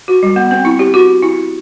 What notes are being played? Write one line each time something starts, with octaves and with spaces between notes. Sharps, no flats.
F#4
G3
B3
C4
E4
G4
F#4
E4